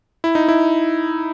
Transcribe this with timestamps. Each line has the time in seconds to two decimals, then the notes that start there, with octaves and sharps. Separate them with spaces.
0.24 E4
0.35 D#4
0.48 E4